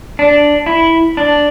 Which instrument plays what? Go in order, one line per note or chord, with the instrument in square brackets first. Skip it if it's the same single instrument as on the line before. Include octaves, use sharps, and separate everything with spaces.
[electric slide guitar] D4
E4
D4